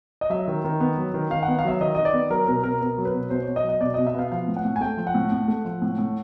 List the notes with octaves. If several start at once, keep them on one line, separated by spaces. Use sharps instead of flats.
D#5
F#3 E5
D#3
D#3
B3
F#3
D#3
D#3 F5
F#5
B3
F5
F#3 E5
D#3 D#5
D#3 D#5
D5
B3
F#3 A#4
B2 A#4
B2 A#4
B3 A#4
F#3
B4
B2
B2 C5
C#5
B3
D#5
F#3
D#5
B2 D5
B2 D#5
E5
B3 F5
F3 F5
A2
F#5
A2
G#5
A3 G5
F3
F#5
A2
A2
A3
F3
A2
A2